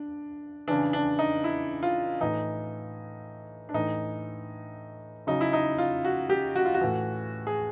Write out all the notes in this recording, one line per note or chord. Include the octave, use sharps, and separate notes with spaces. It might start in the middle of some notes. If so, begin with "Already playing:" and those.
Already playing: D4
C#3 E3 D4
D4
D#4
E4
F4
A2 E3 D#4
D4
A2 E3 D#4
C#3 F#3 D#4
E4
D#4
F4
F#4
G4
F#4
F4
F#4
A2 E3
G#4